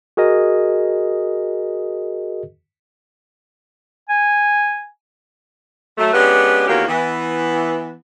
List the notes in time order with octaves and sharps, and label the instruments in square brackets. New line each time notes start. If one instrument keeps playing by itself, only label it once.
[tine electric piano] F#4 G#4 A#4 D#5
[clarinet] G#5
[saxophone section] F#3 A3
G#3 B3 C#4 D4 G4 B4
E2 D#3 A#3 C#4 F#4 G4
E3 B3